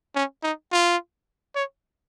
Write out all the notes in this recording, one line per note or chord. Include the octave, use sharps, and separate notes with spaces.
C#4
D#4
F4
C#5